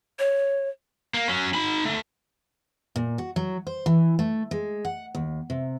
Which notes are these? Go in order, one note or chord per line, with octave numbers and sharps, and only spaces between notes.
C#5
A#3
F#3 C#4
D#4 B5
D3 A3
A#2
F#4
F#3
C5
E3
A3
G#3
F#5
D#2
C3